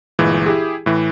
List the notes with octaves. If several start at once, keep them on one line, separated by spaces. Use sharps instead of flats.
G1 A#2 E3 G#3
E4 G4 G#4
A2 E3